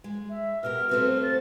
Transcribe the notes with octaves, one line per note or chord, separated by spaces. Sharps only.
G#3
E5
B2 G4 A#4 F6
A3 C4 F#4 B4
C5
A6